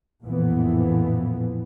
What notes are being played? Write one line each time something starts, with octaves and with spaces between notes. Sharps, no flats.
A1 F2 A#2 E3 F3 B3